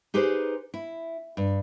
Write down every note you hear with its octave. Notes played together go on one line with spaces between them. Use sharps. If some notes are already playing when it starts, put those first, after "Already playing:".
D#4 G4 G#4 B4 C5
E4
G2